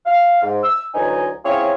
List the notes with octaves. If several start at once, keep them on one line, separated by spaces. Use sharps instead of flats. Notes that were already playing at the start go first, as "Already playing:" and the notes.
F5
G#2
E6
D2 E3 F#3 D#4 D#5 G#5
C4 C#4 E4 F4 G#4 C#5